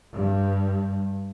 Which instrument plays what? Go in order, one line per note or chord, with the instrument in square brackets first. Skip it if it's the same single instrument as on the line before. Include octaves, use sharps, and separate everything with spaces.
[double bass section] G2